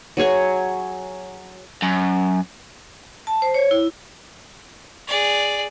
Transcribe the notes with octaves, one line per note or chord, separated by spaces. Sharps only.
F#3 G#4 C#5
F#2
A5
C5
C#5
E4
G#4 D5